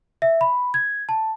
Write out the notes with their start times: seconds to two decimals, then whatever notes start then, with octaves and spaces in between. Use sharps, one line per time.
0.22 E5
0.41 B5
0.74 G#6
1.09 A5